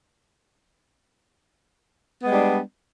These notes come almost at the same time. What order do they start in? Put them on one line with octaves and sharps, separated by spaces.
B3 G#3 G3 D4